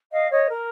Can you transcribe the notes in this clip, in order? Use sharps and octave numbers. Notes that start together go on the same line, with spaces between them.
D#5 F5
C#5 D#5
A#4